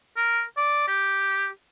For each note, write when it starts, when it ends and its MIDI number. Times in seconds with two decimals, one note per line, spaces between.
0.16 0.43 70
0.57 0.84 74
0.88 1.48 67